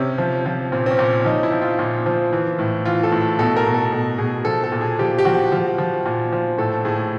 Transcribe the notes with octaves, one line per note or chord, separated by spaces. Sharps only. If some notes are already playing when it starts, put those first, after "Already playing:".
Already playing: C3 C#4
F3
F3
A#2 C4
C4
C#4
A#2
F3 D#4
E4
F3
F4
A#2
F3
E3
A2
E3 F4
A4
A2
B2 A4
A#4
B2
A4
B2 A4
B2 G#4
F3 A4
A4
A#2
G#4
F3 G4
G4
F3 F#4
F3
F3
A#2
F3
A2 A4
A2 G#4